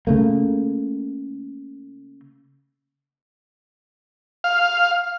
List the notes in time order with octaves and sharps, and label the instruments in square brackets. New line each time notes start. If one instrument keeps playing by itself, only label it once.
[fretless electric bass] C#3 A3 A#3
[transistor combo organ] F5